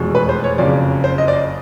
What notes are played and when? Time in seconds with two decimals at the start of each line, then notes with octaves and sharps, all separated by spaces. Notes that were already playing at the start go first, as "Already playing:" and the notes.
Already playing: F1 E2 B2 G#3
0.15 B4
0.29 C5
0.44 C#5
0.58 F#1 F2 C#3 D5
1.04 C5
1.18 D#5
1.28 D5
1.33 D#5